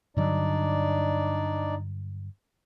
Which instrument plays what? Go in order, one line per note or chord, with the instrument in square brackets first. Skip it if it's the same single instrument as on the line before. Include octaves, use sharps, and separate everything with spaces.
[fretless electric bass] G2 D3 F#3 [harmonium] D4 D#4 D5